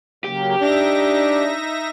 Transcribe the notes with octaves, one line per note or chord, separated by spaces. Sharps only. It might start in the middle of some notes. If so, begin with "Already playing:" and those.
C#3 F#3 A#3 G4
D4 D#4 E5 A#6